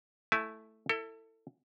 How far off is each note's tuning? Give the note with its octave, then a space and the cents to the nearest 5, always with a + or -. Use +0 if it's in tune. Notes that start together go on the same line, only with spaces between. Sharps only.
A3 +0 E4 +0 G#5 +25
E4 +0 A4 +25